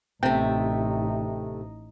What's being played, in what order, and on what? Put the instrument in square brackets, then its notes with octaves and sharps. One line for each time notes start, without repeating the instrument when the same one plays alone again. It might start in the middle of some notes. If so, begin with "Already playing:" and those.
[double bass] A1 D#4 [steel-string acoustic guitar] C3 A3 [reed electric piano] G5